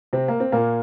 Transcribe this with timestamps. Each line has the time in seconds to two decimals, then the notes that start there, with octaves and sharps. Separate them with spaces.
0.13 C3 C4
0.28 A#3
0.40 C4
0.52 A#2 A#3